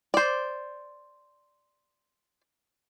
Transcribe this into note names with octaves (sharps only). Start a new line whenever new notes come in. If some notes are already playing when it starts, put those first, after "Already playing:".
C5 D5